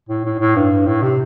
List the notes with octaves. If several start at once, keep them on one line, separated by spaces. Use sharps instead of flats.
A2
A2
A2
G2
A2
C3